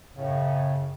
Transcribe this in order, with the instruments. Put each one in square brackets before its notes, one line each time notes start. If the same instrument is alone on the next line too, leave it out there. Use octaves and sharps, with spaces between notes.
[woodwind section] F#2 A2 C#3